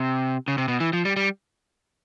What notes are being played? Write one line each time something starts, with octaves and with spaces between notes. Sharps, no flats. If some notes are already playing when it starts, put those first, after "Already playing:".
Already playing: C3
C#3
C3
B2
E3
F3
G3
G3